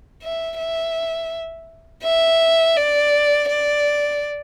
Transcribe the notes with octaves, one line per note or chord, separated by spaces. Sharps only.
E5
E5
E5
D5
D5